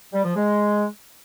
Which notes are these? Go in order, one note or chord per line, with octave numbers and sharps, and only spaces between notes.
G3
F3
G#3